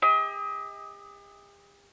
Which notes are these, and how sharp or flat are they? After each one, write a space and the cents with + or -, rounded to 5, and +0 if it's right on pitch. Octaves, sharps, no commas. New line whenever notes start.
G4 +45 D#5 +35